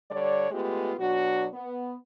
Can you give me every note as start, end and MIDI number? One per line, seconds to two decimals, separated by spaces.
0.11 0.49 50
0.11 0.49 55
0.11 0.49 73
0.11 0.49 74
0.51 0.93 56
0.51 0.93 57
0.51 0.93 59
0.51 0.93 65
0.51 0.93 67
0.99 1.47 47
0.99 1.47 54
0.99 1.47 62
0.99 1.47 66
1.54 1.96 59